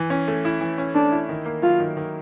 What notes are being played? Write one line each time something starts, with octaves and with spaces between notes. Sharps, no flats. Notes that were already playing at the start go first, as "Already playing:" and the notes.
Already playing: E3
C#4
A3
E4
E3
C#4
A3 D4
E4
D#3
A#3
F#3 F4
D#3
D#3